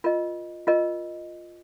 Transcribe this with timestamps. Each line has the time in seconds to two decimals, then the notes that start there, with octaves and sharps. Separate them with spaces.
0.04 F4 A#4 D#5
0.67 F4 A#4 D#5